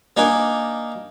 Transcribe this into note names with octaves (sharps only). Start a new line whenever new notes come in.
A#3 D4 D#4 A#4 G#5